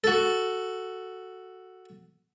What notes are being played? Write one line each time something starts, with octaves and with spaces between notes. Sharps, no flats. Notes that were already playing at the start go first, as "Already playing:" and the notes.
F#4 A4